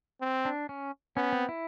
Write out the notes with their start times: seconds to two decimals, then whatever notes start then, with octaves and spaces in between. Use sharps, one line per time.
0.21 C4
0.45 D4
0.69 C#4
1.17 B3 C#4
1.33 C4
1.49 E4